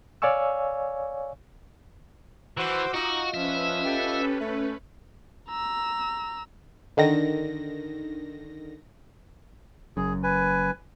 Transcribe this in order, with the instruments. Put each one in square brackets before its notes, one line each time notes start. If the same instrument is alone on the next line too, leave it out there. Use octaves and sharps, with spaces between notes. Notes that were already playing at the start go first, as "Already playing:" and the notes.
[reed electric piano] C#5 D5 F5 G#5 C#6 E6
[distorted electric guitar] E3 [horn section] F#4 C5 [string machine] D6 E6
[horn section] D#4 [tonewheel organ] F4 D#5 F5 [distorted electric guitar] F#4
[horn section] F3 [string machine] C#4 B4 [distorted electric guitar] E5
[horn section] G4 A4
A3
[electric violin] A#5 E6
[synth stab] D3 D#3 A#6
[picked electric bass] F#1 F#2 [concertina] G#4
[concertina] B4 G#5